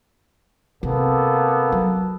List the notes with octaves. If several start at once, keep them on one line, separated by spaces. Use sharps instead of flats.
C3 A#3 B3 A4
F#3